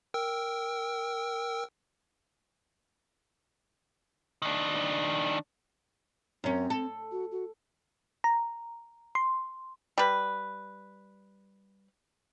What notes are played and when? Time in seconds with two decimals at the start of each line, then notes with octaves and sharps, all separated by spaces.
0.14 A#4 G5 E6
4.42 D#3 D4
6.44 F#2 C4 C#4
6.70 A4
7.12 F#4
7.32 F#4
8.24 A#5
9.15 C6
9.98 G3 B4